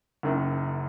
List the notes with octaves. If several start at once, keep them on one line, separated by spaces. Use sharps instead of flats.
F#1 F#2 D#3